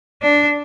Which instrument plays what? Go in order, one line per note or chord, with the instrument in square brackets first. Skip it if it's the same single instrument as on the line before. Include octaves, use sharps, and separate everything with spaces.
[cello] D4